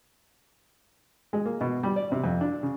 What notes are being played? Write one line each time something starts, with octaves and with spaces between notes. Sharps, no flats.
G#3
A#3
B2
G3
D5
C3
F2
D4
C#3